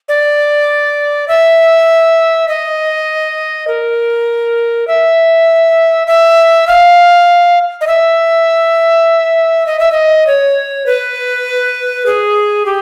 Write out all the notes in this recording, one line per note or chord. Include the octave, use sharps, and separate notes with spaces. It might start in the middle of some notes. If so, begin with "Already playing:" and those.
D5
E5
D#5
A#4
E5
E5
F5
D#5
E5
D#5
E5
D#5
C#5
B4
G#4
G4